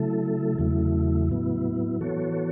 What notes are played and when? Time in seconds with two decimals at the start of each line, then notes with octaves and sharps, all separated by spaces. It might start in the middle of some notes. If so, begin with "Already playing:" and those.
Already playing: C#3 F#3 A3 E4 A4
0.59 E2 C#3 F#3 A3 E4
1.29 A2 F#3 B3 E4
2.00 E3 B3 F#4 A4 C#5